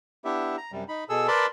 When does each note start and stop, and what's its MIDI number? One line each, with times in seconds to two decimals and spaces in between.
0.25 0.56 59
0.25 0.56 62
0.25 0.56 64
0.25 0.56 67
0.25 0.56 76
0.57 0.72 82
0.72 0.84 42
0.72 0.84 48
0.72 0.84 55
0.88 1.04 63
0.88 1.04 83
1.09 1.27 47
1.09 1.27 68
1.09 1.27 69
1.09 1.27 88
1.28 1.46 70
1.28 1.46 71
1.28 1.46 74
1.28 1.46 81
1.28 1.46 83
1.28 1.46 84